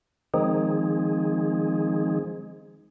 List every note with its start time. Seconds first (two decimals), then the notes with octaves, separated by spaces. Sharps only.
0.34 D#3 F3 G#3 C4 D#4 G#4